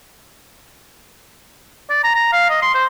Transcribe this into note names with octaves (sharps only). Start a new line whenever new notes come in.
D5
A#5
A#5
F5
D#5
C6
C5